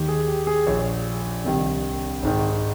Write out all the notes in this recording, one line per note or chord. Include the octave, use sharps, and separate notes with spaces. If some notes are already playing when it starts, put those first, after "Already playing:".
Already playing: D#2 D#3 G4
G#4
G4
G#4
A#1 A#2 C#5
C2 C3 D#3
G#1 G#2 D#3